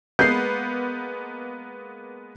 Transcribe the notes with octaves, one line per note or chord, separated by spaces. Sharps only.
G#3 A#3 B3 G6 C7